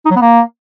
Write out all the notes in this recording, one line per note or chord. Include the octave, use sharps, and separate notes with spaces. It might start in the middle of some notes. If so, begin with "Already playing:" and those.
D#4
F#3
B3
A#3